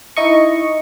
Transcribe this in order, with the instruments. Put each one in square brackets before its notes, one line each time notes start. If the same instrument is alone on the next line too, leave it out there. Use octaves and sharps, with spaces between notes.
[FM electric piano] D#4 E4 D#5 C#6